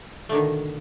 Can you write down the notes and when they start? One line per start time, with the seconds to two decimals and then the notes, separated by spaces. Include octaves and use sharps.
0.29 A3
0.32 D3
0.34 D#3
0.37 B2